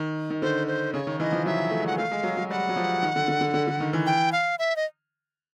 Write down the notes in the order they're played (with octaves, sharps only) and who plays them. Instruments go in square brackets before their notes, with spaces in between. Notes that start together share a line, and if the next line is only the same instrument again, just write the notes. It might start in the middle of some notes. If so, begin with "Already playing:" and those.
Already playing: [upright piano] D#3
D#3
[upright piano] D3 [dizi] C5
[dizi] C5
[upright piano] C#3 [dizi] C#5
[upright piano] D#3
[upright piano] E3 [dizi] D#5
[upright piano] F3
[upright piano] F#3 [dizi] E5
[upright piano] A3
G#3
[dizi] F#5
[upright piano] A3 [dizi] F5
[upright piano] G#3
F#3
F#3
[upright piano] G3 [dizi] F#5
[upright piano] F#3
F3
D#3
D3
D3
D3
D3
D3
D#3
E3
[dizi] G5
F5
E5
D#5